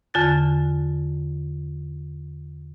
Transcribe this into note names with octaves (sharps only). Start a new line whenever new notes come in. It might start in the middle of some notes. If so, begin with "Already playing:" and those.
E2 D3 F4 A5 F#6 A6